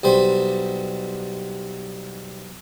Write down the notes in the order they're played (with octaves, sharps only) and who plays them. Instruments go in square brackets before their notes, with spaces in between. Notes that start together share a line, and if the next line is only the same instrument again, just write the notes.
[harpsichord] B1 G3 C5 B5